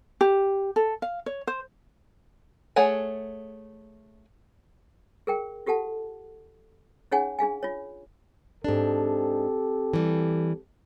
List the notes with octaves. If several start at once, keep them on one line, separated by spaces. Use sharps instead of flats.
G4
A4
F5
C#5
C5
A3 G#4 C#5 F#5 G#5
G#4 A#4 G5
F4 G4 A4 F#5 A5
C#4 D#4 G#4 C#5 F#5 G#5
D4 G#4 F5 G#5
F4 C#5
G#2 C4 D4 G4 A4
E3 G3